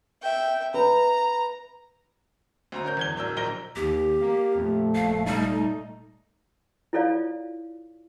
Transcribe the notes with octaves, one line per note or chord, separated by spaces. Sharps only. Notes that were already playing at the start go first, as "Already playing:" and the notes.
E5 G5
B4 A#5
D2 C5 A#5
C#4 A#4 G6
E2 G#6 G7
D1 D4 A#4 E6
A#1 A#4 A#6 G7
D#2 G4
A#3
F2 A#2 A3
D#1 F5
F1 G3 D#4
E4 F4 A4 C#5 D5 F5